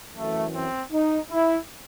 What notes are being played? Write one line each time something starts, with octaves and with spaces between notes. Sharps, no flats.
F#2 E3 A3
C4
D#4
E4